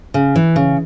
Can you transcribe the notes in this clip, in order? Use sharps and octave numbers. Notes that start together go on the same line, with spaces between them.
C#3
E3
C#3